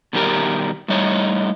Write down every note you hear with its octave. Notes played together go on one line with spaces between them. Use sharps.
B2 D#3 G3 B3 G4 A#4
A2 G3 D#4 C#5